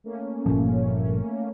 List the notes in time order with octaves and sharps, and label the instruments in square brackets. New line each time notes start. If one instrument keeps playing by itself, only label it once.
[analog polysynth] A3 A#3 C#4
[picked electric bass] G1 A#2 F3